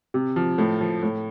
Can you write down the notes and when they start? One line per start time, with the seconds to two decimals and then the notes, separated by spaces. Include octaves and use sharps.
0.14 C3
0.36 F3
0.58 A2
0.81 F3
1.03 A2